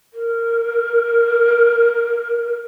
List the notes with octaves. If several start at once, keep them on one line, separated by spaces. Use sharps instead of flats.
A#4